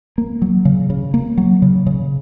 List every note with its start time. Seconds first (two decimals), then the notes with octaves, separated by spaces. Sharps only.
0.18 A#3
0.42 F#3
0.65 C#3
0.90 C#3
1.14 A#3
1.38 F#3
1.62 C#3
1.87 C#3